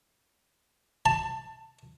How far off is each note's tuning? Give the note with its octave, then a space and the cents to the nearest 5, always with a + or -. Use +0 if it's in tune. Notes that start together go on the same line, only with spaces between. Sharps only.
A5 +20